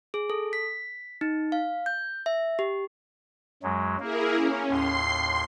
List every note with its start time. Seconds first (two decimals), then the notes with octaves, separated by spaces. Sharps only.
0.14 G#4
0.30 A4
0.53 B6
1.21 D#4
1.52 F5
1.86 G6
2.26 E5
2.59 G4
3.63 F#2 F#3 G#3
4.00 A#3 E4 G#4 A#4
4.35 C#4
4.69 D#2 A2 C6 C7